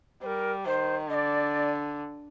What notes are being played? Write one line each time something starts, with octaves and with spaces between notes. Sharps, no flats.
G3 A#4 C5
D#3 C5
D3 D5 D#5